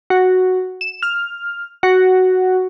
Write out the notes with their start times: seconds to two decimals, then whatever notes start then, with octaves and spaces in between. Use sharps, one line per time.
0.10 F#4
0.81 E7
1.03 F6
1.83 F#4